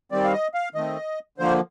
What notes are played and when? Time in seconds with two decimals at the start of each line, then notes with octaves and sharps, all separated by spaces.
0.12 D#3 G3 C4 D5
0.24 F5
0.33 D#5
0.54 F5
0.75 D#3 A3 C4 D#5
1.38 D3 F3 A#3 C5